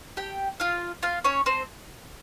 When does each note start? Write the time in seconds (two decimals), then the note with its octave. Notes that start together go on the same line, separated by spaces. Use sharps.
0.17 G4 G5
0.60 F4 F5
1.03 F4 F5
1.24 C#4 C#5
1.46 C4 C5